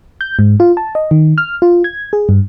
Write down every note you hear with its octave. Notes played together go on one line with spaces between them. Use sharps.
G6
G#2
F4
A5
D#5
D#3
F6
F4
G#6
G#4
G2